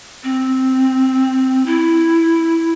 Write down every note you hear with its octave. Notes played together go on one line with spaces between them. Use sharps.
C4
E4